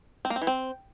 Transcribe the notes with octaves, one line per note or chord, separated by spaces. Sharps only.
C4
A#3
C4
E3
C4